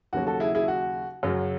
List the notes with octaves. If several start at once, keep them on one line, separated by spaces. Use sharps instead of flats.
D#2 C#3 F#3 F#4
F#4 A4
E4 G#4
E4 G#4
F#4
F#2 C#3 F#3